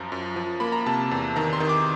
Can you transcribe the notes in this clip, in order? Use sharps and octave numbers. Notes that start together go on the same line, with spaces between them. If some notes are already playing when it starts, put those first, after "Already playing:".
Already playing: F#2 F3 A#5
F#2
F3
A#3 B5
A#5
C3 A5
E2
D#3 A#5
C6
D#3
D6